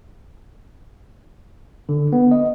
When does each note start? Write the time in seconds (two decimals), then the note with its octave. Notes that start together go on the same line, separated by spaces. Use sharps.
1.89 D3
2.13 B3
2.31 D#5